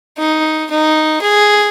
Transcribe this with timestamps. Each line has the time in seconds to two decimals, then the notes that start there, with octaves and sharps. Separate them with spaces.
0.19 D#4
0.71 D#4
1.22 G#4